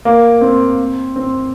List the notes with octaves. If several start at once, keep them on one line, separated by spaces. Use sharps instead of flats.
A#3
C4
C4